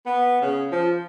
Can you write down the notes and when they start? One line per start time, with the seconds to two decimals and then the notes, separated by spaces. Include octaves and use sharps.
0.06 B3
0.41 C#3
0.72 F3